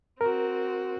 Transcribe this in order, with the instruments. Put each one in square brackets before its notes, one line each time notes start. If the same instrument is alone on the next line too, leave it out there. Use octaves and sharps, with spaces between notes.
[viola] C4 F#4 [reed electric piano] A#4